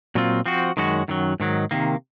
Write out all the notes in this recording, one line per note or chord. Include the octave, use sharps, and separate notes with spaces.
A#2 F#3 C4 F4
F3 C4 F#4
F#2 D#3 G#3 C#4 F#4
F#2 D#3 F#3
G#2 D#3 F#3
C3 D#3 A#3